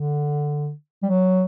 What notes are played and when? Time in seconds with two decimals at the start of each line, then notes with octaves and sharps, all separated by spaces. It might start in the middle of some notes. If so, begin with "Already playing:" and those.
Already playing: D3
1.03 G3
1.06 F#3